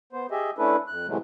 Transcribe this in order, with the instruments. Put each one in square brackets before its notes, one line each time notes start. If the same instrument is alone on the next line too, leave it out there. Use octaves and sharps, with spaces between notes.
[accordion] B3 C5
G4 G#4 D#5 E5
A3 C#4 D4 E4 A4 B4
F2 F#6
A2 C3 E3 F#3 G#3 A3